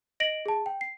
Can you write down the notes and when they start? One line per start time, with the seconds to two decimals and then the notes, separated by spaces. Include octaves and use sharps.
0.20 D#5 A#6 D7 F#7
0.46 G#4 A5
0.66 G5
0.81 C7